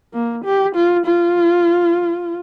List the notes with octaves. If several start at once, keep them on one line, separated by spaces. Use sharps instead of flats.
A#3
G4
F4
F4